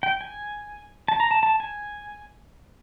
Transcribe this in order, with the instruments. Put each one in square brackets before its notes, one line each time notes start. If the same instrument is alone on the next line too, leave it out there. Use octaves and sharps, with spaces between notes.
[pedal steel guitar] G5
G#5
A5
A#5
A5
A5
G#5